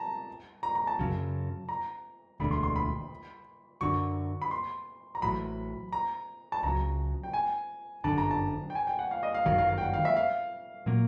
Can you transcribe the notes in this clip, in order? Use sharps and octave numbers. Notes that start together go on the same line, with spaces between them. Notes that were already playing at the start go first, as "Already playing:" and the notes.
Already playing: A5 A#5
A#5
A#5
A5
F#2 C#3 F#3
A#5
E1 D2 D3 B5
C6
C6
B5
F#2 D3 F#3 C#6
B5
C6
A#5
A1 A2 F#3 B5
A#5
A5
C#2 C#3 F#3 A#5
G5
G#5
G1 F#2 D3 A5
A#5
A5
G5
G#5
G5
F#5
F5
D#5
F5
G1 F#2 D#3 F#3 F5
F5
F5
G5
F#5
F5
E5
F5
A#2 F#3 A#3